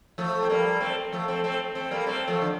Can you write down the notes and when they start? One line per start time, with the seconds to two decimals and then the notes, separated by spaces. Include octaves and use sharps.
0.18 F3 A3
0.43 C4
0.49 G3 A#3
0.80 A3 C4
1.13 F3 A3
1.28 A3 C4
1.44 A3 C4
1.75 A3 C4
1.91 G3 A#3
2.07 A3 C4
2.28 F3 A3
2.41 D3